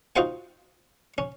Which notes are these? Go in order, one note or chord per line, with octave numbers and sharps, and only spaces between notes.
D#4 F4 F#4 C5 F#5 G5
C#4